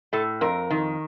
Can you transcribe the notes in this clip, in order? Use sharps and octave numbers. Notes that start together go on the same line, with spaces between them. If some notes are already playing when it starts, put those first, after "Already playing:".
A2 A4
F2 A#4
D#3